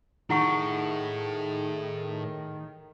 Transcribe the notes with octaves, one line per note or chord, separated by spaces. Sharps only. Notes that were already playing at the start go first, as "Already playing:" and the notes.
A2 D#3 E4 G#4 F#5 C#6